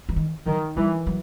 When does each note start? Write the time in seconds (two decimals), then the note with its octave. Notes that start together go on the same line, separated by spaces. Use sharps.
0.09 E3
0.16 D#3
0.46 D#3 F#3
0.76 E3 G3
1.07 F#3